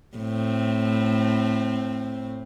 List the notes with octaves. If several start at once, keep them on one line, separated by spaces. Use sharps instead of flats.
A2 C4